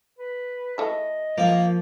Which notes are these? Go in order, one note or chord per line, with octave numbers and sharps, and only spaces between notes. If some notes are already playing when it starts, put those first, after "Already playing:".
B4
A3 E4 D#5
F3 A#3